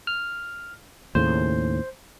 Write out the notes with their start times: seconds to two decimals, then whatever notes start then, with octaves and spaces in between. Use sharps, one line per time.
0.07 F6
1.15 D#2 A2 C#3 C5